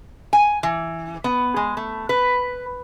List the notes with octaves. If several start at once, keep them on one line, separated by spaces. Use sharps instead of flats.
G#5
E3
B3
G#3
A3
B4